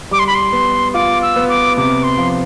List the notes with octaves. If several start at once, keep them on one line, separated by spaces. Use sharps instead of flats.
G3 D6
C6
B5
C6
B3
F4 D6
E6
B3
D6
C3 D6
C6
F3